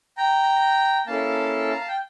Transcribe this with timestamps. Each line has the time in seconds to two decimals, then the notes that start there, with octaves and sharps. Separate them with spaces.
0.17 G5 A#5
1.07 A#3 C#4 E4 A4 F5 A5
1.71 A#5
1.80 A5
1.88 G5